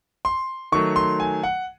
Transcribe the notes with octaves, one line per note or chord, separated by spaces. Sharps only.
C6
D#3 F#3 A3 C#6
C6
G#5
F#5